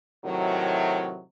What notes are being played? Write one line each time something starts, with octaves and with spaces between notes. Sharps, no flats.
A2 C3 D#3 F#3